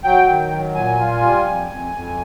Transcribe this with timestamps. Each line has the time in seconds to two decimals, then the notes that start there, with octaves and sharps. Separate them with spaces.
0.04 F#3 G5
0.28 D#3
0.52 F#3
0.74 A#2 G#5
0.99 F4
1.22 G3
1.45 F2
1.70 F2
1.93 F2